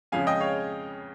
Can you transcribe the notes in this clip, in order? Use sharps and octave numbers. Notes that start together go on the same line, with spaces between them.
F2 C#3 F3 G#3 F5 G#5
D#5 G5
C#5 F5